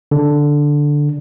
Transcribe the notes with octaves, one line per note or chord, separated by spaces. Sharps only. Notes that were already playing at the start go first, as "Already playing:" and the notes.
D3